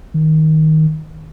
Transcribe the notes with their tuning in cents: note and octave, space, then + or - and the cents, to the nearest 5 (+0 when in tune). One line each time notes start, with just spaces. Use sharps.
D#3 +10